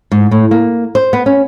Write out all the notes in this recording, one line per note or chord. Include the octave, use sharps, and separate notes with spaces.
G#2
A2
A#3
C5
B3
C#4